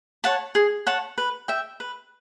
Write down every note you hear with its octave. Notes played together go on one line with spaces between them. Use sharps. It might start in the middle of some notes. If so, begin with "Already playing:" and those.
C#5 F#5 A5
G#4
C#5 F#5 A5
B4
E5 G5
B4